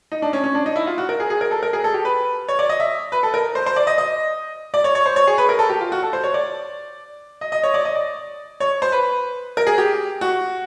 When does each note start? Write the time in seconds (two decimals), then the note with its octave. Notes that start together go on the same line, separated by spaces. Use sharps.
0.12 D#4
0.22 D4
0.33 C#4
0.44 C#4
0.55 D4
0.66 D#4
0.76 E4
0.87 F4
0.98 F#4
1.09 A#4
1.20 G#4
1.30 G#4
1.41 A#4
1.51 A4
1.63 A#4
1.73 G#4
1.84 A4
1.94 G4
2.05 B4
2.48 C#5
2.59 D5
2.69 D#5
2.80 E5
3.12 B4
3.23 A4
3.34 A#4
3.55 C5
3.66 C5
3.76 D5
3.87 D#5
3.98 D#5
4.74 D5
4.84 C#5
4.95 C#5
5.06 C5
5.16 C#5
5.27 G#4
5.38 B4
5.49 A#4
5.59 A4
5.69 G4
5.81 F4
5.92 F#4
6.03 A4
6.13 C5
6.24 C#5
6.34 D5
7.41 D#5
7.52 D#5
7.63 C#5
7.74 D5
7.85 D#5
7.95 D5
8.60 C#5
8.82 C5
8.92 B4
9.57 A#4
9.67 G#4
9.78 G4
10.21 F#4